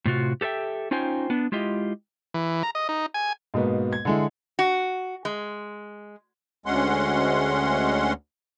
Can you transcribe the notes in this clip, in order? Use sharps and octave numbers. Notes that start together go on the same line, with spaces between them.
A2 C3 F4 F#4
G4 A4 B4 E5 G5
C#4 D#4 F4 C5 G5 G#5
B3 D4
G#3 E4 F4 G4 D#5
E3
A#5
D#5
D#4
G#5
G#2 B2 A#3 B3
G#6
D3 G#3 E4
F#4
G#3
D2 G#3 C#4 F#5 C6